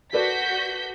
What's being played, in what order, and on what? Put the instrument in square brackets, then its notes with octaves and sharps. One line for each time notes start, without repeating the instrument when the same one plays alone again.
[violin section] F#4 G6 B6 [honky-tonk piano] A4 B4 D5